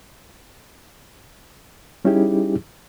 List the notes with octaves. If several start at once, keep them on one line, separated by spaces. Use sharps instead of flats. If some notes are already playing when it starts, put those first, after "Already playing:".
G3 C#4 D#4 E4 G4 G#4